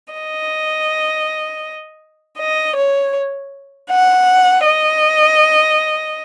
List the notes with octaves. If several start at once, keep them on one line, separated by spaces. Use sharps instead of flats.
D#5
D#5
C#5
F#5
D#5